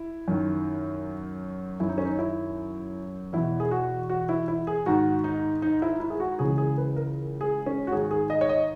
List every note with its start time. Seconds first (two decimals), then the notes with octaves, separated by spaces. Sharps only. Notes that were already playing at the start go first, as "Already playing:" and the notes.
Already playing: E4
0.28 F#2 D#3
1.80 F#2 D#3 E4
1.89 D#4
1.98 C#4
2.05 D#4
2.19 E4
3.33 E2 B2 E4
3.60 G#4
3.71 F#4
4.10 F#4
4.29 E4
4.48 E4
4.67 G#4
4.86 G#2 D#3 F#4
5.24 D#4
5.62 D#4
5.82 E4
6.00 E4
6.10 G#4
6.20 F#4
6.39 C#2 C#3 E3 G#4
6.58 G#4
6.78 B4
6.96 A#4
7.41 G#4
7.66 C#4
7.87 F#4
7.92 G#2 D#3 G#4
8.11 G#4
8.30 D#5
8.41 C#5
8.49 D#5